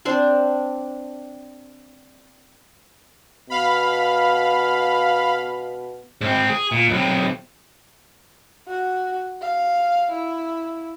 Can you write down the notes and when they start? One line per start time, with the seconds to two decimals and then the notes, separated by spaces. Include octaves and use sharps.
0.05 C4 D4 C5
3.50 B2 F5 B5
6.21 G#2 C4
6.49 G#4
6.72 A#2
6.89 B1 C3
8.68 F#4
9.41 F5
10.12 E4